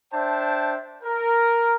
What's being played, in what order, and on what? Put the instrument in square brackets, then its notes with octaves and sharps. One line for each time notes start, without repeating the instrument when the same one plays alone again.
[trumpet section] D4 C5 E5 G5 A5
A#4